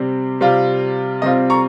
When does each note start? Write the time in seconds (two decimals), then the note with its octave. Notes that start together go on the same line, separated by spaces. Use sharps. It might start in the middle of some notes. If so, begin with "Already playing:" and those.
Already playing: C3 G3 C4
0.40 C3 G3 C4 F4
1.22 C3 G3 C4 F4 D#5
1.50 A#5 C#6